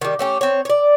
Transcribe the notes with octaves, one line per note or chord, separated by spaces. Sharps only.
D#3 G3
A3 C#4 G4
C4 C#5
C#5 D5